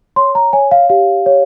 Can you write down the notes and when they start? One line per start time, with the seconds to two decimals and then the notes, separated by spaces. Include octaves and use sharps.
0.16 C#5 C6
0.35 A#5
0.53 C#5 G#5
0.71 F5
0.90 G4 F5
1.26 C#5